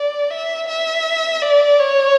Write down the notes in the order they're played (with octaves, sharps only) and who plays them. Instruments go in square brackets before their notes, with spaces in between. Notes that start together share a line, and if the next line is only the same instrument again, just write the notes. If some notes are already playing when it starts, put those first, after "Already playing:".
Already playing: [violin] D5
E5
E5
D5
C#5